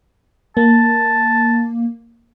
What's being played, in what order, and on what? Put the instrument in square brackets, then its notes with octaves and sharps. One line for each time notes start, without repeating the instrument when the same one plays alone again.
[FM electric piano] A#3 [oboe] A5